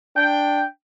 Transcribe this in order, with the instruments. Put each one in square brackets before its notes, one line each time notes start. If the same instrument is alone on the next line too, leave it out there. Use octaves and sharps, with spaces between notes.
[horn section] D4 G5